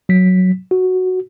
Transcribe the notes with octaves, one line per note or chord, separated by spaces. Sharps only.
F#3 B6
F#4